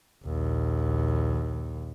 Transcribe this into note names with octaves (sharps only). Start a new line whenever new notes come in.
A#1 D#2